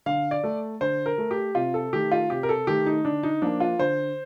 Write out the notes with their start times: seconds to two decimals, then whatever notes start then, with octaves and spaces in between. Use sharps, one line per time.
0.06 D3 F5
0.31 D5
0.44 A3
0.81 D3 C5
1.06 A#4
1.18 A3
1.31 G4
1.55 C3 F4
1.74 A4
1.93 D#3 A3 G4
2.12 F4
2.30 C3 G4
2.43 A#4
2.49 A4
2.67 D#3 A3 G4
2.86 D#4
3.05 D3 D4
3.23 D#4
3.42 F3 A#3 D4
3.60 F4
3.79 D3 C5